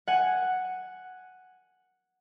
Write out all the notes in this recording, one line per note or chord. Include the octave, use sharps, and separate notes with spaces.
F#5 G#5